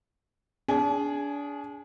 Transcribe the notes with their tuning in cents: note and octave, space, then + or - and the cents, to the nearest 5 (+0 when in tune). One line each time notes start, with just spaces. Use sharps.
D4 -30 G#4 +0